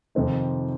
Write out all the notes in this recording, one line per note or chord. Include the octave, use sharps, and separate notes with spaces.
F2 C3 D#3 C4 D#4